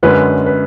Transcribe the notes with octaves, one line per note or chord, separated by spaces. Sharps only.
F#2 D3 G#3 C#4 B4
B4